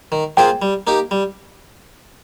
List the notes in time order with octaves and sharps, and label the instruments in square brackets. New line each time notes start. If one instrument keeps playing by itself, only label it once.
[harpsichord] D#3
[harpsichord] A#3 F4 G#4 C5 [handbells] G5
[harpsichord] G3
A#3 D#4 G4
G3